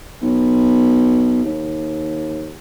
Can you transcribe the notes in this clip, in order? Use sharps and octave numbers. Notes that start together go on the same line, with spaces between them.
B1
D#2